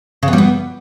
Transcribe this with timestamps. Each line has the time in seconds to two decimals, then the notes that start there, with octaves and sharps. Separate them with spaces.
0.23 C#3
0.28 B3
0.33 G3
0.38 B3